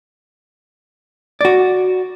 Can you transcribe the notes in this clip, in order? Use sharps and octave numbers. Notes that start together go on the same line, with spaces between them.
F#4 D5